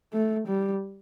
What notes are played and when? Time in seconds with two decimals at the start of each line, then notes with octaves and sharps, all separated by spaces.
0.13 A3
0.47 G3